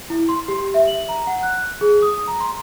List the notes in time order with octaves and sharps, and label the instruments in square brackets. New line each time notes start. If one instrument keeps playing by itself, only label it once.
[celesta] E4
C6
G4
E5
F#7
A#5
F#5
F#6
G#4
D#6
A#5
C6